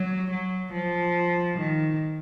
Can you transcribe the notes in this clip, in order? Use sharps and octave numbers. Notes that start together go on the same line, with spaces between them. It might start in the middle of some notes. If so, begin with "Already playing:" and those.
Already playing: F#3
F#3
F3
D#3